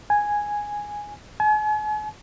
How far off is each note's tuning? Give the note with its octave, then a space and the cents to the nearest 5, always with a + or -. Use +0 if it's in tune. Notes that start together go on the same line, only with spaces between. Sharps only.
G#5 -5
G#5 +40